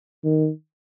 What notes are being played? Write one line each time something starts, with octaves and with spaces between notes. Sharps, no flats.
D#3